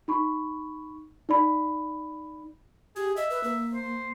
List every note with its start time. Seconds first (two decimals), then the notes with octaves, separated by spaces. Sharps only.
0.08 D#4 B5 C#6
1.29 D#4 D5 B5
2.96 G4 G#4
3.17 D#5 E5
3.30 B4
3.44 A#3
3.74 C5